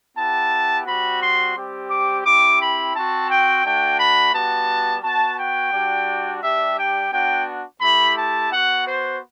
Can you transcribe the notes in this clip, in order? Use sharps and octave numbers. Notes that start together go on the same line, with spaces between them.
B3 E4 G4 A5
G3 C4 F#4 B5
C6
G3 C4 G4
D6
C4 E4 G4 D6
B5
C4 F#4 A5
G5
A3 D4 F#4 G5
B5
G3 B3 F#4 A5
B3 F#4 A5
G5
G3 D4 F#4
G3 D4 G4 E5
G5
B3 D4 F#4 G5
A3 E4 G4 B5
A5
B3 F#4 F#5
C5